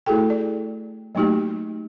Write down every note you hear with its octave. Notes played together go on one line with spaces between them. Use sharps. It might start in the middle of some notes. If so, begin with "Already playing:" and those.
A3 E4 F#4 G#4 A4 G5
D5
F#3 A3 A#3 D#4 F#4 G4